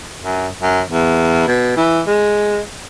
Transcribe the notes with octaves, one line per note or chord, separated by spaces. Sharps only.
F#2
F#2
E2
B2
E3
G#3